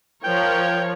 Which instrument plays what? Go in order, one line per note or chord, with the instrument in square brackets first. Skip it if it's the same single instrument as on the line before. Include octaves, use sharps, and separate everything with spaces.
[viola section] F3 A#4 C#5 [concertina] G5